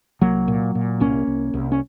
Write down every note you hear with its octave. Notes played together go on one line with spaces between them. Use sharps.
C2 F#3 A#3
A#2
A#2
C2 A#3 C#4
C2
C2
C#4